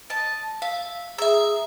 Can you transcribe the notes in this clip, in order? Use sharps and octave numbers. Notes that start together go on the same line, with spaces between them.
D#5 A5
E5 F5
G#4 E5 A#5 E6